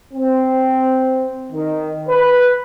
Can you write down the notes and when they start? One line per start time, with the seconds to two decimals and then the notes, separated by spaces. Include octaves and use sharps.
0.13 C4
1.51 D#3
2.08 B4